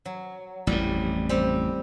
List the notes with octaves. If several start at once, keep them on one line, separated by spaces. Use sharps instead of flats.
F#3
A1 F2 A2 G3
G3 C4